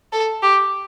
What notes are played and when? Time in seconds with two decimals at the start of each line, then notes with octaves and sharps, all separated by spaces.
0.13 A4
0.42 G4